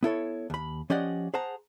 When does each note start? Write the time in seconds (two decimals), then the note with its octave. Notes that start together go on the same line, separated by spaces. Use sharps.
0.03 B3 E4 A4 C#5
0.50 D#2 B5
0.90 F3 C#4 G4 D5 D#5 F#5
1.34 G#4 C5 F#5 A5 A#5